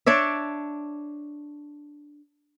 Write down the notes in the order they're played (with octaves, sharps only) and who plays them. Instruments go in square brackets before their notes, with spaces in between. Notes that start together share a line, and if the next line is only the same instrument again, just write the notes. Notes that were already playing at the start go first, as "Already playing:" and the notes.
[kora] D4 C#5 D5 E5